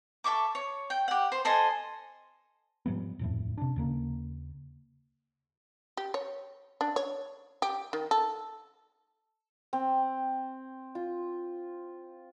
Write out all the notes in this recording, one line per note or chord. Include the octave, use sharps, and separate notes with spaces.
A4 E5 C#6 D6
C#5
G5
G4 F#5
C5
A4 C5 D#5 G#5
G#2 F3 G3 B3
D#1 F2 A2
C3 D4
D#2 C#3 A#3
G4
C#5
D4
C#5
G4
D#3
A4
C4
F4